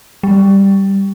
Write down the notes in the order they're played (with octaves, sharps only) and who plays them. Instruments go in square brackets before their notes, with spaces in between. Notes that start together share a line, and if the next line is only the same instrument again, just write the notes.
[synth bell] G3